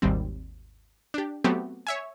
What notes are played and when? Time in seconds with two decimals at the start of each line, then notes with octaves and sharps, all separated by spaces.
0.02 G#1 D#2 G3 C4
1.14 D4 G4
1.44 F#3 A3 B3 C4 F#4 G4
1.87 C#5 E5 G#5